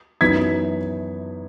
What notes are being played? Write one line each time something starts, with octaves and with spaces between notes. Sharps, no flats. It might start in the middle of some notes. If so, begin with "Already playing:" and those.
F#2 E3 B3 D#4 G#6 B6